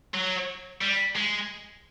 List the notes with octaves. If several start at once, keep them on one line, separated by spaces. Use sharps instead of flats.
F#3
G3
G#3